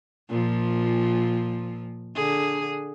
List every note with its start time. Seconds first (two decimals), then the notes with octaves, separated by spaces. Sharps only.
0.29 A#2 F3
2.15 D3 G#4